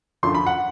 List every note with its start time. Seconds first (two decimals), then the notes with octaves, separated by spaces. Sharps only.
0.23 F#2 D3 F3 C6
0.35 B5
0.46 F#5